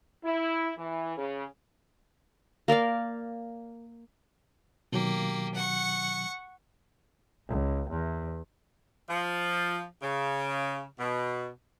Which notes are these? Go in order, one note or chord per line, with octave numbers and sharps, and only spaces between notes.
E4
E3
C#3
A#3 A#4 D5 F5
B2 D#3 F#3 A#3 G4
F#5 C#6
C#2
E2
F3
C#3
B2